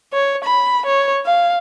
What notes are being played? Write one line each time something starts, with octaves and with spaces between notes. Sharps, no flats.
C#5
B5
C#5
F5